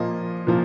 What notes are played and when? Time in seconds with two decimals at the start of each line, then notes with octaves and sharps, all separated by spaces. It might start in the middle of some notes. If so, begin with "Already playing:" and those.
Already playing: A#2 F3 A#3 D#5
0.47 A#2 F3 A#3